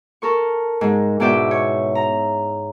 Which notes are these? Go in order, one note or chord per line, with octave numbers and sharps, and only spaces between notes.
A4 A#4 C#6
G#2 G#3
G#2 B2 E4 D5 E5 G5
C#5
A#5